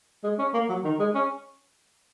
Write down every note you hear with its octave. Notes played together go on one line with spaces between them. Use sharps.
G#3
C#4
A#3
F#3
D#3
G#3
C#4